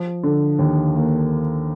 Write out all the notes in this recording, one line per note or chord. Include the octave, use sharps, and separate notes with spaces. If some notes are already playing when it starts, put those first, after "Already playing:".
Already playing: F3
D3
D#2
A#3